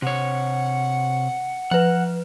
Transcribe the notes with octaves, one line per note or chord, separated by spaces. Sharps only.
C3 C#5 F#5
F3 B4 F#5